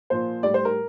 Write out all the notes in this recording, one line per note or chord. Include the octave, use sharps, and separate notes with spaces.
A#2 F3 C5
A2 G3 D5
C5
A#4